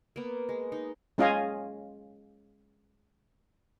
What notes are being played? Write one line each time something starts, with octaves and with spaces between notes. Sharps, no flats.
A#3 B3
G#3
D#4
G#3 C#4 F4 D#5 F5 G#5